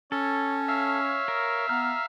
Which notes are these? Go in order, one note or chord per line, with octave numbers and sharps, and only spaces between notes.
C#4 A4 C#5
C#5 E5 F5
A#4
B3 A#5 F6